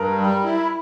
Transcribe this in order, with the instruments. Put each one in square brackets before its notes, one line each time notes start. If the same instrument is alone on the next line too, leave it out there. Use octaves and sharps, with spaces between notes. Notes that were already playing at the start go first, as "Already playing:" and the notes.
Already playing: [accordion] G2 [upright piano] A#4
[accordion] G3
E4